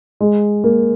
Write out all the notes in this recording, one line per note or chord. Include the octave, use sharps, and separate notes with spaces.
G#3
A#3